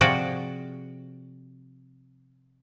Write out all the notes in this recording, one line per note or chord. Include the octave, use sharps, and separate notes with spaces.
C3 F3 F#4 G#4 D5 G5